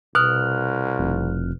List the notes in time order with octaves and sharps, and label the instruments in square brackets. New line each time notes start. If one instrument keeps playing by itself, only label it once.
[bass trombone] C2 [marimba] B2 [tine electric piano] F6 F#6
[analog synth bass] F1